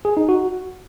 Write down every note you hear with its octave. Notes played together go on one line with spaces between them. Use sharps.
G#4
D#4
F#4